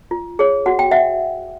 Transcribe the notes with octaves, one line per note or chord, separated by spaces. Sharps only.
F4
G#4 C#5
F#4 F#5
G5
E5 F#5